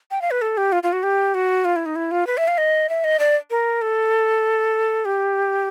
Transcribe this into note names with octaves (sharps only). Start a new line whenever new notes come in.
G5
F5
B4
A4
G4
F4
F4
F#4
G4
F#4
F4
E4
D#4
E4
F4
B4
E5
F5
D#5
E5
D#5
D5
A#4
A4
G4